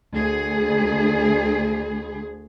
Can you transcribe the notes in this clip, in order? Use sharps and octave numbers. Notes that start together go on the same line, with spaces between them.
D2 G#4